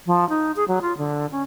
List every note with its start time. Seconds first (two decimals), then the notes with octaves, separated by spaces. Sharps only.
0.06 F3
0.29 D#4
0.56 G#4
0.68 F#3
0.82 F4
0.98 D3
1.31 C#4